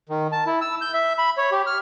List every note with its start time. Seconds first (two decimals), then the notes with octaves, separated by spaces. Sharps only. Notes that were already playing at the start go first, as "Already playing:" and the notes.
0.09 D#3
0.32 A5
0.46 E4
0.61 E6
0.81 G6
0.94 E5
1.19 B5
1.38 C#5
1.52 G4
1.67 F6